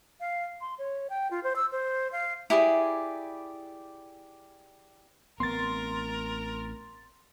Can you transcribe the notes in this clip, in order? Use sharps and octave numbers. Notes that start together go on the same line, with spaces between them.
F5
C6
C#5
G5
F4
C5
E6
C5
F5
E4 G4 G#4 D5
A1 B3 C4 A#4 C6 A6